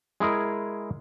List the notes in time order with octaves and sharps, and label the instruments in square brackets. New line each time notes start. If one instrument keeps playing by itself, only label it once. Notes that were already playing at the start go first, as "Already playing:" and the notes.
[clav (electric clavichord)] G#3 E4 G#4 A#4